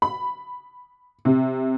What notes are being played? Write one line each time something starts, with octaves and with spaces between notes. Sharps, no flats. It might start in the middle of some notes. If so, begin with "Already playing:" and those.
B5
C3